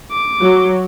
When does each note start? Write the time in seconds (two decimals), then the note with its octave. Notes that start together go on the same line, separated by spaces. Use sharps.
0.12 D6
0.41 F#3